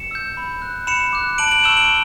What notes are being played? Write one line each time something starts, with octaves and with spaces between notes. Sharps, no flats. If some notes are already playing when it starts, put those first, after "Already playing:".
Already playing: C#7 E7
E6 G6
B5
F#6
B5 C#7 E7
D6 F#6
A5 D7 F#7
D7 F#7
C#6 E6 G6 E7 G7
D7 F#7